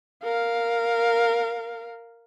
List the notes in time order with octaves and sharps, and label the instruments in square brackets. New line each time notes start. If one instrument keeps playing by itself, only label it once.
[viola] A#4 F5